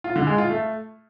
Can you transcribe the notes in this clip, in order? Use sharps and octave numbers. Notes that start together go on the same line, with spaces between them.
F4
D3
G#3
F4
A3